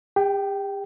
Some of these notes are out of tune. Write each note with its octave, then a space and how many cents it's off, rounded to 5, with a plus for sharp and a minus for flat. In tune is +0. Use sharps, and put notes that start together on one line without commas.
G4 +40 G5 -10